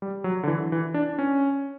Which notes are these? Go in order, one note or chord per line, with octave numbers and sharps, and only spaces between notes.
G3
F#3
D3
E3
E3
D4
C#4